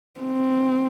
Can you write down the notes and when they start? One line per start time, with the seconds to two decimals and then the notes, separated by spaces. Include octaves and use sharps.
0.21 C4